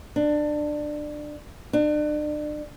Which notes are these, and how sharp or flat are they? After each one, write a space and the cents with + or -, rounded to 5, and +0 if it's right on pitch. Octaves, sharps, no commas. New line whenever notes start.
D4 +20
D4 +35